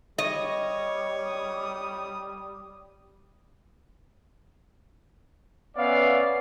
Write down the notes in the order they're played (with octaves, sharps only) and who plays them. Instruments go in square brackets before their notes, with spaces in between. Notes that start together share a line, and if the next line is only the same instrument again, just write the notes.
[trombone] G3 [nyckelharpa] C#5 [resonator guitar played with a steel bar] D#5
[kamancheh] D#6
[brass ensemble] B3 C#4 D5 E5 F5